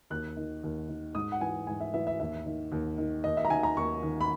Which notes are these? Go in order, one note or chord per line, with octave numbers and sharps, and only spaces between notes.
D#2 F#6
D#3
D#2
D#3
G#2 D#6
F#5
E3 G#5
G#2 G#5
E5
E3 E5
E5
D#2 E5
D#3
D#2
D#3
D#2 D#5
E5
A#5
D#3 G#5
A#5
D#2 C#6
D#3
B5